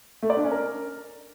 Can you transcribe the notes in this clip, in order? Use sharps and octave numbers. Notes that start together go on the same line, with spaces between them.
A3
D5
D4
C#4
A#4